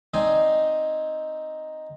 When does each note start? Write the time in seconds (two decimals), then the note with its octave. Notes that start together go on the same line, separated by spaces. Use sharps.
0.14 C4 D#4 D5 D#5 G#5 C6